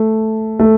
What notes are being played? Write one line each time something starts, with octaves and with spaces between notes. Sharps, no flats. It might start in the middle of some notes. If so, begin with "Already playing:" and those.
Already playing: A3
A3